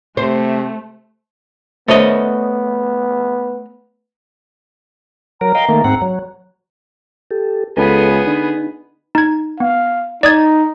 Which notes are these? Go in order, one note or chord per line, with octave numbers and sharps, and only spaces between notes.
C3 A3 C5
A3 B3 C5 C#5 D#5 E5
F#3 A#4 A#5
D#5 F5 G5
D#3 A3 A#3
G#2 C4 F#5
F#3
G4 A4
C#2 B3 G#4 A4 B4
D3 D#4
D#4 G#6
B3 F5
D#4 D5 D#6 G#6